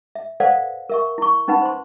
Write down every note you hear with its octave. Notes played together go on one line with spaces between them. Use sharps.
E5
A4 B4 C5 D5 F5 F#5
A#4 E5 C#6
E4 C#6
C#4 D#4 B4 F#5 B5
C5 C6